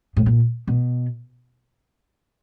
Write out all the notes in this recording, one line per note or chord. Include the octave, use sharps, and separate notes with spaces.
A2
A#2
B2